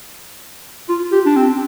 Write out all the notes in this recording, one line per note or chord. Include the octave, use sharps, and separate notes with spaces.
F4
G4
D4
C4